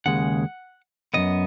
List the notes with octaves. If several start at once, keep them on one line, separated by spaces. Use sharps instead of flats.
D#2 C#3 G#3 F#5
F#2 C#3 B3 D#5